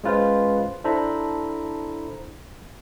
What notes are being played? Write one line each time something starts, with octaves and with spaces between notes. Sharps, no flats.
G#3 C#4 F4 B4 C5
D4 E4 A4 C5 A#5 B5